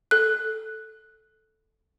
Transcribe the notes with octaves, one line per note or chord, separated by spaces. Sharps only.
A4 F#6